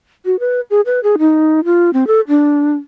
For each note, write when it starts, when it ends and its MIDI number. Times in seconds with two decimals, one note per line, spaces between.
0.25 0.39 66
0.40 0.60 71
0.70 0.81 68
0.86 1.00 71
1.03 1.16 68
1.18 1.64 63
1.65 1.93 65
1.93 2.07 60
2.07 2.21 69
2.28 2.74 62